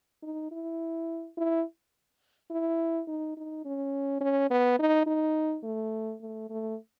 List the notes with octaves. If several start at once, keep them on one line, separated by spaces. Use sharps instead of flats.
D#4
E4
E4
E4
D#4
D#4
C#4
C#4
B3
D#4
D#4
A3
A3
A3